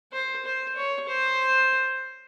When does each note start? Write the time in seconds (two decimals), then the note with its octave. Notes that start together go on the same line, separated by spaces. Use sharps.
0.12 C5
0.45 C5
0.76 C#5
1.08 C5